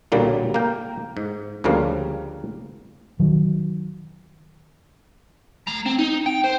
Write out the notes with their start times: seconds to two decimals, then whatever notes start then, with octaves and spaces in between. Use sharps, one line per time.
0.12 B1 A#2 D3 F#3 G3 A#3
0.54 A#3 A#4 G5
1.17 G#2
1.64 D2 C#3 F3 G3 A#3 F5
3.20 D#3 F#3
5.68 A3 A#5
5.86 C4
5.99 D#4
6.26 G5
6.44 C5